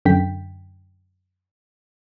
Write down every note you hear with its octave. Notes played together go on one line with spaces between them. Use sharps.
F#2 D3 G5 B6